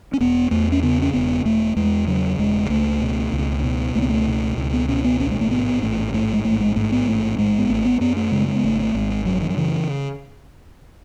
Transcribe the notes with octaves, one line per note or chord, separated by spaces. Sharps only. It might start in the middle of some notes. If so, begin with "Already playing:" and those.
C#4
E1 B3
E2 A3
C#4
C#3 B3
C#4
E1 B3
E1 A3
E2 G#3
C#3 F#3
E1 G#3
C#2 A3
B2
C#2
B2
C#2 A3
B3
A3
B2
C#2
B3
B2 C#4
B3
A1 C#4
G#3
A3
G#2 B3
A1 A3
G#2 A3
G#3
A1 A3
G#3
G#2 A3
B3
A1 A3
G#2 G#3
B3
G#1 A3
B3
F#2 B3
A3
C#3 G#3
G#3
B3
G#1 A3
A3
G#1 G#3
G#3
F#2 F#3
D#3
F#3
C#3 E3